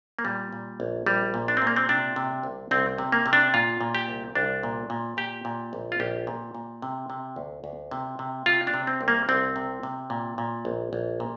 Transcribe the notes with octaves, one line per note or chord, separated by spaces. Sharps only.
A#3
A#2 G3
A#2
A#1
A#1 G3
A#2
D4
C4
A#2
A#3
C4
C3 D4
C3
C2
C2 C4
C3
A#3
C3
D4
A#2 F4
A#2
G4
C2
C2 D4
A#2
A#2
A#2 G4
A#2
A#1
F4
A#1 G4
A#2
A#2
C3
C3
D2
D2
C3
C3
C3 F4
D4
C3
C4
C2
A#3
C2 C4
C3
C3
A#2
A#2
A#1
A#1
A#2